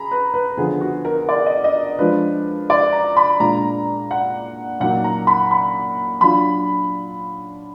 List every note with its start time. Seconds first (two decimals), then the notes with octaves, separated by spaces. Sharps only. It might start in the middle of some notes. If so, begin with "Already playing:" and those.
Already playing: G#4 A#5 B5
0.11 B4
0.34 B4
0.57 D3 F3 B3 G#4
0.81 F#4
1.05 A#4
1.29 D5
1.46 D#5
1.64 D#5
1.99 F3 G#3 D4 F4 B4
2.70 D5
2.93 A#5
3.17 B5
3.40 A#2 G#3 D4 F4 A#5
4.11 F#5
4.80 A#2 F#3 A#3 D#4 F#5
5.04 A#5
5.27 B5
5.51 B5
6.21 F#3 D4 F4 B5